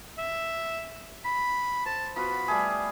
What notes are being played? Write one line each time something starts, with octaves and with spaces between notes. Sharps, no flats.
E5
B5
C5 A5
B3 F4 F#4 B5
G3 A3 G#4